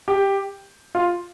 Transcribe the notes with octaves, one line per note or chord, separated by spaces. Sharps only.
G4
F4